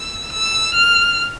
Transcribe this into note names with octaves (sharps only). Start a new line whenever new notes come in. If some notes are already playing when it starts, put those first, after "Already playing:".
Already playing: E6
E6
F6